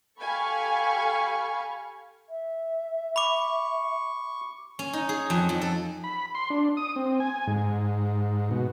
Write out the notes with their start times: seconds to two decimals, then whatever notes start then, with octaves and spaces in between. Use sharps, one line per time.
0.21 G4 A4 F5 G#5 B5 C#6
2.30 E5
3.16 B5 C#6 D6
4.79 C#4
4.93 D#4
5.09 G#4
5.30 F2
5.49 F2
5.61 A4
6.04 B5
6.35 C6
6.50 D4
6.77 D#6
6.96 C4
7.20 G#5
7.47 G#2
8.51 B2